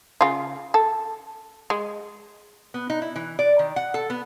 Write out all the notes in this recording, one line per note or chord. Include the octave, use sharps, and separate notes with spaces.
C#3 F4
A4
G#3
B3
D#4
E4
E3
D5
D#3
F#5
A4
B3